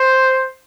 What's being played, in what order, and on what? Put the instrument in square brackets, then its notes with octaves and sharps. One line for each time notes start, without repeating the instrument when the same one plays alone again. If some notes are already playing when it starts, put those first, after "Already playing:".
Already playing: [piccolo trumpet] C5